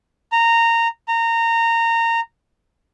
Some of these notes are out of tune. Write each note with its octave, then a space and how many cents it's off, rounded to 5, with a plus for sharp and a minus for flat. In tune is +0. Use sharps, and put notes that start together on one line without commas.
A#5 -15
A#5 -20